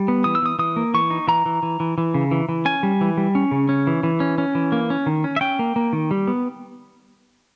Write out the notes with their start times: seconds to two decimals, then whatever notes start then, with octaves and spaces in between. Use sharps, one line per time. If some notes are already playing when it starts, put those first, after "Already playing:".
Already playing: G3
0.08 B3
0.24 E3 D#6
0.35 E6
0.42 E3 D#6
0.59 E3 D#6
0.76 A#3
0.94 E3 C#6
1.10 D#4
1.28 E3 A#5
1.46 E3
1.63 E3
1.80 E3
1.98 E3
2.14 C#3
2.31 E3
2.49 E3
2.65 C#4 G#5
2.83 G3
3.01 E3
3.17 G3
3.35 C#4
3.51 C#3
3.69 C#4
3.87 E3
4.03 E3
4.20 C#4
4.38 C#4
4.55 E3
4.72 A#3
4.90 C#4
5.06 D#3
5.24 C#4
5.36 E5
5.41 C#4 G5
5.59 A#3
5.76 A#3
5.93 D#3
6.11 G3
6.28 B3